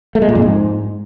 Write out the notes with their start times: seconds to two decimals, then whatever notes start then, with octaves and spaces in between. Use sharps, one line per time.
0.15 A3
0.22 G#3
0.29 A#2
0.35 F2
0.42 G#2